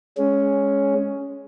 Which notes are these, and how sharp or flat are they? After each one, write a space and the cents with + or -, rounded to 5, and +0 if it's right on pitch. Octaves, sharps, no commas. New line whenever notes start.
G#3 +0 C#4 +5